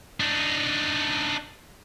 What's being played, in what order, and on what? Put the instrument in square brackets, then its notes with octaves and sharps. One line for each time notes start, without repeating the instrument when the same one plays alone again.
[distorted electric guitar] D4 D#4